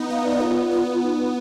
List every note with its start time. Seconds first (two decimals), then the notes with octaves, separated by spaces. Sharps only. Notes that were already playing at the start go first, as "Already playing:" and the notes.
Already playing: B3 D#4
0.10 B3 F5
0.25 D5
0.41 B3 F4
0.71 B3
1.02 D#4